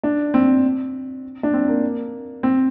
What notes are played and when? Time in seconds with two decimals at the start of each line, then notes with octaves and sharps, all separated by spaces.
0.03 D4
0.34 C4
1.43 D4
1.54 C4
1.68 A#3
2.43 C4